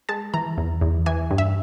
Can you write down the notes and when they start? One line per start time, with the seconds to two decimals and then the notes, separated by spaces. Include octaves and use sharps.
0.09 G#3 A5
0.34 E3 A#5
0.58 E2
0.81 E2
1.06 E3 G#5
1.31 G2
1.38 E5